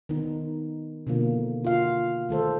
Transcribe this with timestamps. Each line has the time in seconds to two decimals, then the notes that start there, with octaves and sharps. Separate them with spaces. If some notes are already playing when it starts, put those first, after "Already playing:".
0.09 D#3 B3 D#4
1.07 B2 D3 F3 A#3
1.65 F4 F#4 F5
2.29 D#3 A3 A4 C5